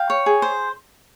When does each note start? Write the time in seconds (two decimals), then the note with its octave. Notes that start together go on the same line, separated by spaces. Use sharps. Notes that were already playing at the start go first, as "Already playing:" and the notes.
Already playing: F5 G5
0.10 C#5
0.26 G#4
0.42 C5